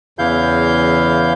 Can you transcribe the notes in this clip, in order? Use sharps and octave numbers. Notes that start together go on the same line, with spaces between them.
E2 C#3 E3 E4 F5 G6